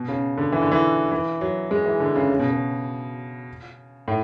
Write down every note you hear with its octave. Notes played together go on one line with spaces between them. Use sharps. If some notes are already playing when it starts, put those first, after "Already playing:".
Already playing: B2
C#3
D3
E3
D3
E3
E3
F#3
G#3
E3
D3
C#3
C#3
B2
C#3
A2